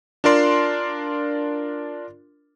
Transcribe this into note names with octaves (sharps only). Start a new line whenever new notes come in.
D4 F4 A#4 D5 C6